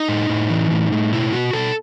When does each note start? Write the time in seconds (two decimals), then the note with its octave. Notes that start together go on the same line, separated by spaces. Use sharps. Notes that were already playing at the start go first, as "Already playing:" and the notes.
Already playing: D#4
0.09 A2
0.29 A2
0.50 E3
0.71 A2
0.92 A2
1.12 B2 E4
1.33 B2 F#4
1.53 B2 A4